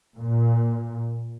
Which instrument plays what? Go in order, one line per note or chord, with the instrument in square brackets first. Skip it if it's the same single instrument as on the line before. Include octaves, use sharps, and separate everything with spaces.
[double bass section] A#2